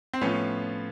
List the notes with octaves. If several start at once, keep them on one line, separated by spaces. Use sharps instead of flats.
C4
A2 F3 B3 C#4